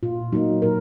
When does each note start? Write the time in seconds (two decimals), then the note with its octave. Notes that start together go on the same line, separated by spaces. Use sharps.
0.03 A#2 F4
0.32 F#3 A#3 D#4
0.62 A#2 A#4